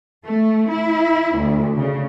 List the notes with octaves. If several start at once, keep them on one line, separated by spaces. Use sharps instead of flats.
A3
E4
D2
C#3